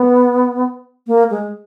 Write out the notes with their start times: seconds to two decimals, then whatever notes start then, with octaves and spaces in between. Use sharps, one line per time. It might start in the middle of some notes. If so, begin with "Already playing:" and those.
Already playing: B3
1.07 A#3
1.30 G#3